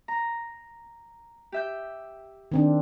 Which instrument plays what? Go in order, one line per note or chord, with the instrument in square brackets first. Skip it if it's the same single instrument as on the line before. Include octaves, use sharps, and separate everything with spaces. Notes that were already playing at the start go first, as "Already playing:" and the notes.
[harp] A#5
G4 E5 G6
[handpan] D#3 C4 D4